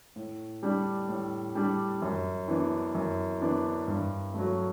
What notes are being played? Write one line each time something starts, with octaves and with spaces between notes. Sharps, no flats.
A2
G3 D4
A2
G3 D4
F#2
E3 B3 D4
F#2
E3 B3 D4
G2
F#3 A3